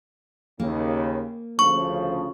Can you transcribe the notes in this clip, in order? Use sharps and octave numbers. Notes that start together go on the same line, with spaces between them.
D#2 C#3 A#3
D2 C#3 F3 C#6